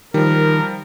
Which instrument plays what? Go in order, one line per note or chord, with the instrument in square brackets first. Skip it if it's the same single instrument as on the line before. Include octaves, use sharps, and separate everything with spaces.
[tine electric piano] D#3 [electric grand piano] F3 G3 [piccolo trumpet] A#4